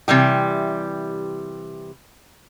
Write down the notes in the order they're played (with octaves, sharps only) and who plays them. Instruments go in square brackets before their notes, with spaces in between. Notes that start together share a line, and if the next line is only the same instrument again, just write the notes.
[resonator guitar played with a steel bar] C3 E3 G3 G4